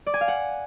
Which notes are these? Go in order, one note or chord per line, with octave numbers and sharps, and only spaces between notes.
D5
G#5
F5
F#5